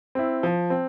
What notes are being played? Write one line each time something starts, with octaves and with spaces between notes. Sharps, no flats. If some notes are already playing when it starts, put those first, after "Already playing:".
C4 E4
F3
C4